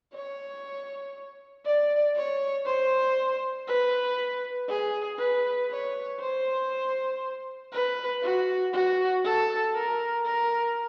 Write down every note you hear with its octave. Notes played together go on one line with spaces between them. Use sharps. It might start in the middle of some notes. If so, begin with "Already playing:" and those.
C#5
D5
C#5
C5
B4
G#4
B4
C#5
C5
B4
F#4
F#4
A4
A#4
A#4